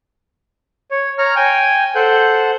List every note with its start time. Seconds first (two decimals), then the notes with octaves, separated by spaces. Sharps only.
0.91 C#5
1.18 C#5 A#5 F6
1.36 G5 G#5
1.95 A4 C5 F#5 G6